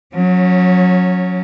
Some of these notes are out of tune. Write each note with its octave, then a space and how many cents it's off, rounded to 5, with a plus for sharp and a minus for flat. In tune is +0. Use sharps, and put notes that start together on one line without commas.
F#3 -25 C#4 +0